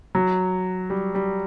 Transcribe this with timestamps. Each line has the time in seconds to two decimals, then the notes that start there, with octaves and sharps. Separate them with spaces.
0.15 F#3
0.90 G3
1.15 G3